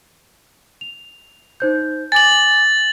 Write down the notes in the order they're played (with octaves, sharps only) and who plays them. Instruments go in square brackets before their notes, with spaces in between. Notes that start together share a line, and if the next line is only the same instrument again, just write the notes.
[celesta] F7
D#4 C5 G6
[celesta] G#5 D6 [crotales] A6 F#7